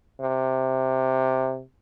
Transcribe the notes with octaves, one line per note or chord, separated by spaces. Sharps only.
C3